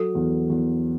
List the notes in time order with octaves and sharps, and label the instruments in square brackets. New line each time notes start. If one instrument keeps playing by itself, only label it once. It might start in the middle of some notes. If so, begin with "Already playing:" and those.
Already playing: [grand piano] F#3 [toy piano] A4
[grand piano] E2
E2